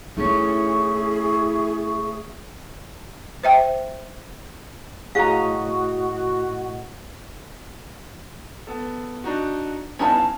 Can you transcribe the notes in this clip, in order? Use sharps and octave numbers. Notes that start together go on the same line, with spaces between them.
A3 C#4 D#4 E4 G#4 E5 C#6
C5 E5 G5
A2 F#4 G#4 D#5 F5 A#5 D#6
B3 A4
D4 D#4 F#4
G2 B3 C#4 D#4 E4 A5
F5